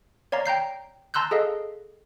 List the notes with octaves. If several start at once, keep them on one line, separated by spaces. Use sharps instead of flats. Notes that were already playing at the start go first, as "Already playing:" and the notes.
C#5 D5 F5 A#5
G5 A#5 G6 C7
A5 A#5 C6 E6 F#6 G6
G#4 A4 D#5 F5